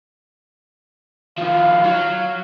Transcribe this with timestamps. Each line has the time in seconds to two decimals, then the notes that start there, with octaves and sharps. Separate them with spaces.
1.38 D#3 F3 F5
1.84 F#3